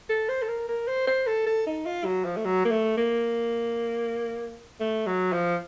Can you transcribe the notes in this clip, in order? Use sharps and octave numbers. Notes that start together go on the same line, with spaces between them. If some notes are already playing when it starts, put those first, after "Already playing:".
A4
C5
A4
A#4
A#4
C5
C5
A4
A4
D#4
F4
F#3
F3
A3
F#3
A#3
A3
A#3
A3
F#3
F3